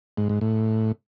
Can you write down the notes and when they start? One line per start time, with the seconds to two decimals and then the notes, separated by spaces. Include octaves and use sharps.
0.17 G#2
0.29 G#2
0.41 A2